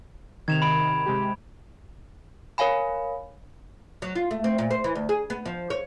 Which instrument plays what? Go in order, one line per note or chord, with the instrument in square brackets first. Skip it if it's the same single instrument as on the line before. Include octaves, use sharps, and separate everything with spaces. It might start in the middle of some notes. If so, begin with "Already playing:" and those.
[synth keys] C3 D#3 [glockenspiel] G#6 E7 F7
[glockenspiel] B5 D7
[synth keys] C3 G#3 G4
[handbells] A#4 C#5 F5 G#5 B5
[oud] F#3
F4
A3
C4
A#2
C5
E3
D2
G#4
B3
F3
C#5